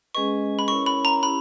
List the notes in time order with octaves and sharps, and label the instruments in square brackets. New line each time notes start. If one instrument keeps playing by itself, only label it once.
[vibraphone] G#3 C#4 G#4 B4 D#5 [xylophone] C#6
[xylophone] B5
[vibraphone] C#4 E4 A#4 C#5 [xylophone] C#6
[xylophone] B5
A#5
[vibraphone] C#4 E4 G4 [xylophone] B5